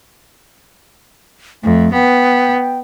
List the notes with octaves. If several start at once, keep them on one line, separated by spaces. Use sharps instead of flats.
F2 A3
B3 G5